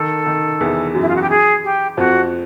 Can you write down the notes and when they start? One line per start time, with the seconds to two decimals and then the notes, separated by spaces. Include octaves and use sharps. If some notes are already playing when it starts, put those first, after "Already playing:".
Already playing: D#3 A4
0.26 D#3
0.61 E2 E3
0.95 F#2 F#3
1.01 E4
1.08 F4
1.15 F#4
1.21 G4
1.29 G#4
1.63 G4
1.97 F2 F3 F#4